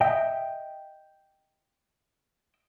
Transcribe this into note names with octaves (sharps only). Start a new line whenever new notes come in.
D#5 E5 G5